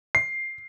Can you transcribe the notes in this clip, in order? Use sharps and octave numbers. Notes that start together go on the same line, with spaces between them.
C7